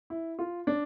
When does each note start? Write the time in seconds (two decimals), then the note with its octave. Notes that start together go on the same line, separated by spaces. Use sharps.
0.10 E4
0.39 F4
0.67 D4